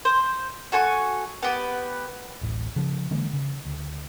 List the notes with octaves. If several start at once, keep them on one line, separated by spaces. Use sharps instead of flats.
C5
F#4 A4 G#5 C#6
B3 G4 B4
D1 A1
C#3 F3
D3 E3 G#3 A#3
C#3
D2